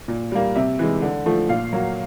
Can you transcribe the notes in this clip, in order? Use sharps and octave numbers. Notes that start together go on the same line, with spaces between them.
A#2
G3 A#3
C3 E5
E3 G#3
D3
F3 A3
A#2 F5
F#3 A#3